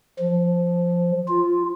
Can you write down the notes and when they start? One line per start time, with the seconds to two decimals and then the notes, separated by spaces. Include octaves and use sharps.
0.19 F3
1.28 F4